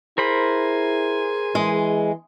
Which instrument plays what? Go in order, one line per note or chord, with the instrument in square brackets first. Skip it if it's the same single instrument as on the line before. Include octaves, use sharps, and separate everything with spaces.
[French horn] E4 [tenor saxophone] G#4 [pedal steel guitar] A#4 C5 B5
[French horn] E3 [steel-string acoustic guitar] G#3